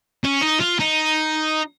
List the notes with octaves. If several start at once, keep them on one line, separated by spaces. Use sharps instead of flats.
C#4
D#4
F4
D#4